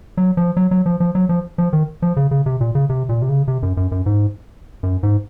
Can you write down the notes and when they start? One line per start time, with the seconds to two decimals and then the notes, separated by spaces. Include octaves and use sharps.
0.18 F#3
0.37 F3
0.57 F#3
0.71 F#3
0.86 F3
1.00 F3
1.15 F#3
1.29 F3
1.58 F3
1.73 D#3
2.02 F3
2.17 C#3
2.31 C#3
2.46 C3
2.61 A#2
2.75 C#3
2.90 C3
3.09 A#2
3.22 C3
3.29 C#3
3.48 C3
3.63 F#2
3.77 F#2
3.92 F#2
4.06 G#2
4.83 F#2
5.03 G#2